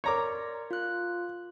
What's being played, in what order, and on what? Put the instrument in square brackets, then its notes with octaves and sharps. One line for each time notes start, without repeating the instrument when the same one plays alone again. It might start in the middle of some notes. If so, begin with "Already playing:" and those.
[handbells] A#4 D5 C6 [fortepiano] C#5 A#5 D6
[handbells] F4 F#6